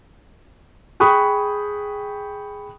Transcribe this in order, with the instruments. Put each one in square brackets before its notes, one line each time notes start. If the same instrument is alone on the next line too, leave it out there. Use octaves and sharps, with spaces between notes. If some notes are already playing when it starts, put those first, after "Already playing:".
[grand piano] G#4 G5 B5 C#6 D#6 F#6